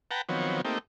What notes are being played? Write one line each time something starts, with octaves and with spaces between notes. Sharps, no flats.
B4 F#5 G5 A5 A#5
D#3 F3 F#3 B3 C4 C#5
A3 A#3 C4 D#4 G4